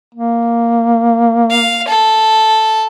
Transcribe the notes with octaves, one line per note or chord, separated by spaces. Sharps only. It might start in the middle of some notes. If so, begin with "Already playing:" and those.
A#3
F5
A4